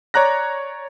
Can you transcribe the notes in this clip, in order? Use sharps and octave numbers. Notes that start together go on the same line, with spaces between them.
C#5 D5 A#5 F#6 A#6